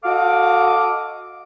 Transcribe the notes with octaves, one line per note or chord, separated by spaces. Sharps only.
F#4 A4 D#5 F5 D6